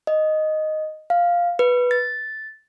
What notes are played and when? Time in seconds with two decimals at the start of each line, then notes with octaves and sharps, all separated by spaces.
0.07 D#5
1.10 F5
1.59 B4
1.91 A6